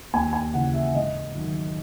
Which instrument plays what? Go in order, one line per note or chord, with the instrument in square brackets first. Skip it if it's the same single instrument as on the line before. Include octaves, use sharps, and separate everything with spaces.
[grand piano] D#2 G#5
G#5
C#3 E3 F#5
E5
G#2 D#5
D#3 F#3